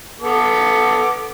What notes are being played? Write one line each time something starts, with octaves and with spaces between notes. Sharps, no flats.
B3 A4 D6